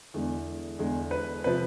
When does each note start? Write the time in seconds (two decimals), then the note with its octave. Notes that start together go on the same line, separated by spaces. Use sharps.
0.14 E2 D3 G#3
0.79 E2 D3 G#3
1.11 B4
1.44 C3 F3 B4